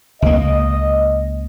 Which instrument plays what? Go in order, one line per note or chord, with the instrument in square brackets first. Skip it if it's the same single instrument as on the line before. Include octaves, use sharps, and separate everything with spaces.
[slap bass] C#2 A#3 [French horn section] D#5